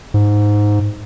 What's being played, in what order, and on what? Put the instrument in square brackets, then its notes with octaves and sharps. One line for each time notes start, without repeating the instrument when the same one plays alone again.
[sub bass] G#2